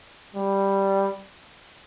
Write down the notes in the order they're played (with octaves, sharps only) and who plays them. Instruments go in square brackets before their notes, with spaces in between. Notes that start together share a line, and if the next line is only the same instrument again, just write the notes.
[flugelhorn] G3